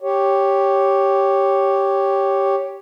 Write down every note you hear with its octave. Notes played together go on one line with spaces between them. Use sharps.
G4 C#5